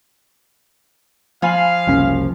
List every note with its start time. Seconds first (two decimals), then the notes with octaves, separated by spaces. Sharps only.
1.42 F3 F4 F5 G#5 B5
1.87 F#1 C2 C#4